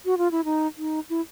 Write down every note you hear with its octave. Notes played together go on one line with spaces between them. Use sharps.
F#4
F4
E4
D#4
D#4
E4